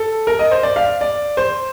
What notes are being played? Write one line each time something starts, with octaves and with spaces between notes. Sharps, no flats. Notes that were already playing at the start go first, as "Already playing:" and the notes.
Already playing: A4
A#4
D#5
C5
D5
F5
D5
C5